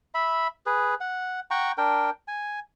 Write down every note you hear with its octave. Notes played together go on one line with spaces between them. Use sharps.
E5 B5
G#4 B4
F#5
F#5 G5 A#5 C#6
D4 A#4 G5
G#5